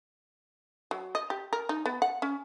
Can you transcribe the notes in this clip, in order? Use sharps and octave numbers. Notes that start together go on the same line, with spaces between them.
F#3
D#5
G4
A#4
D#4
B3
F#5
C#4